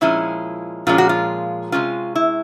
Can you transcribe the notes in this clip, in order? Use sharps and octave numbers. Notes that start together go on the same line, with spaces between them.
A#2 F3 G#3 C#4 E4
A#2 F3 G#3 C#4 F4
F#4
F4
C3 D#3 G#3 C#4 F4
E4